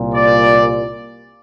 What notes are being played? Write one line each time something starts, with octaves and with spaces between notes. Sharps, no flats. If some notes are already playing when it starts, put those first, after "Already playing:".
Already playing: C2 A#2
D5